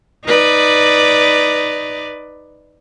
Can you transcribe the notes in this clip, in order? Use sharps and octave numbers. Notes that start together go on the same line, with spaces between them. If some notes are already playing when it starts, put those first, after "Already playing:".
D#4 B4 D5